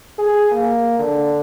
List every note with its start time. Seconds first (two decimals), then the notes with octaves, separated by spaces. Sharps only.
0.18 G#4
0.52 A#3
0.99 D3